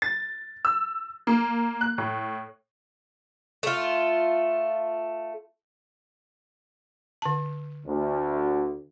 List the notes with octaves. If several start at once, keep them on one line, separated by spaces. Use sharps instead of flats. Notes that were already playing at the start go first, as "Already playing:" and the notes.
A6
E6
A#3
F#6
A2
A3 F4
D3 A5
D2